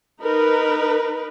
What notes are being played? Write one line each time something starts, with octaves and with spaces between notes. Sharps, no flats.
D#4 A#4 B4